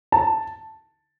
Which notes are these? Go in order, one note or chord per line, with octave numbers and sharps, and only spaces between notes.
A5